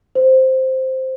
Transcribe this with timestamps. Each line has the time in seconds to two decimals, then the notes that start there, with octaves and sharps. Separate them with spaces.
0.15 C5